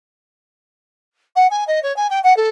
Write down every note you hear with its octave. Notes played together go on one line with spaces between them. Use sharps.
F#5
G#5
D#5
C#5
G#5
G5
F#5
A4